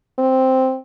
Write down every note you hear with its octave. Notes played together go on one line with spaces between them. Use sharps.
C4